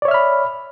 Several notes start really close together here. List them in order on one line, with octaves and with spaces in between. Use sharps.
D5 C#5 E5 F6 B5